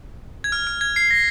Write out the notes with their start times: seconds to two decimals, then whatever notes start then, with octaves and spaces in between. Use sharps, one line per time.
0.44 G#6
0.52 F6
0.67 F6
0.81 G#6
0.96 C7
1.11 A#6